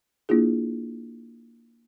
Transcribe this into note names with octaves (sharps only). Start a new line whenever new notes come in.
A#3 D4 E4 F4 G#4